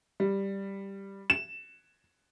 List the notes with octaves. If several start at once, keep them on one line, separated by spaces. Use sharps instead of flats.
G3
E7